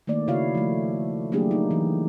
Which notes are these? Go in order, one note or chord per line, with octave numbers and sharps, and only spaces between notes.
D#3 A3 A#3 D5
C#3 E4 F#4 C#5 F5
F3 A3
F#3 A3 A#3 D4 G4 G#4
D#4
E3